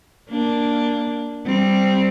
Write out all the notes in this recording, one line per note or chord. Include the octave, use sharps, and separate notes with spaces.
A#3 D4
G3 C4